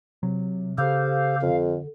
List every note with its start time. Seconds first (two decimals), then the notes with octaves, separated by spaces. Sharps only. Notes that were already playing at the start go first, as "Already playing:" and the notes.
0.23 C3 F#3
0.78 C#3 G4 A4 C5 F5
1.42 F2 D3